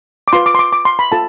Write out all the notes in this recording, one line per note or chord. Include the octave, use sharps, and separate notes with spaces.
D6
F4 B4 C6
D6
C6
D6
D6
C6
B5
F4 A4 A5